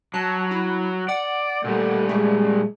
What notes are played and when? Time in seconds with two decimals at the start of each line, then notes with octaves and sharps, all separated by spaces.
0.14 F#3 A5
0.51 E4
1.08 D5 F#5
1.64 A#2 G3 A3
2.09 G#3 A3